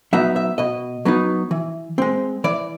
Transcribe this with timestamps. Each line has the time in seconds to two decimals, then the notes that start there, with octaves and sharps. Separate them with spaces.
0.13 F#3 B3 D#4 E5
0.36 E5
0.58 B2 D#5
1.05 F#3 B3 D#4
1.51 E3
1.98 G#3 C4
2.44 E3 D5